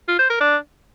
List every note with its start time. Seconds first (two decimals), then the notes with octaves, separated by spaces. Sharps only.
0.08 F4
0.19 C5
0.30 A#4
0.41 D4